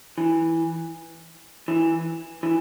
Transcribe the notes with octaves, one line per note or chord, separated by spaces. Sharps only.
E3
E3
E3